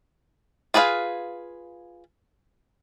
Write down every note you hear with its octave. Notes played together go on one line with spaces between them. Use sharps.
F4 G#4 B4 D#5 F5